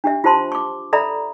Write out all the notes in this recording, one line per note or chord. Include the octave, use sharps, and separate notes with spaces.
D4 G4 E5
F4 G4 C5 A5 C6
C#6 D6
A4 D5 E5 A#5 B5